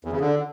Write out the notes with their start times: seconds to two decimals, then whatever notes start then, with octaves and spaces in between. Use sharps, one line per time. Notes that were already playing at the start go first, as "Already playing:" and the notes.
0.05 E2
0.12 C#3
0.20 D3